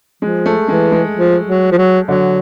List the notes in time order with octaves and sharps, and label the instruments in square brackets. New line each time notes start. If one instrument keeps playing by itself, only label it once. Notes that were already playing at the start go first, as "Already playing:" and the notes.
[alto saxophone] F3 [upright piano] G#3
[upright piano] A3
[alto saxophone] E3 [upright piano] G#3
[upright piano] G#3
[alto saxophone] F3
F#3
F3
F#3
[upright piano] D3 [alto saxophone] F#3